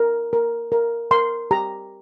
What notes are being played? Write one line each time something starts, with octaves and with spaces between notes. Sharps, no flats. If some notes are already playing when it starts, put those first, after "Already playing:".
Already playing: A#4
A#4
A#4
A#4 C6
G4 A#5